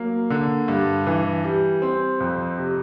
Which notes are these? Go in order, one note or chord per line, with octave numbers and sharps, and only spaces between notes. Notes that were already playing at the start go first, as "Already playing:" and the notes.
Already playing: F#3 A#3
D3
G2
E3
G3
C4
F2
C3